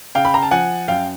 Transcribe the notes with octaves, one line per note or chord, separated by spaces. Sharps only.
C#3 F5 G5
B5
A#5
A5
F3 F#5 G#5
F#2 F5 G5